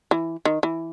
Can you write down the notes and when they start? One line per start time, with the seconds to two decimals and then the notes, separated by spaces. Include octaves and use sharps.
0.11 E3
0.45 D#3
0.63 E3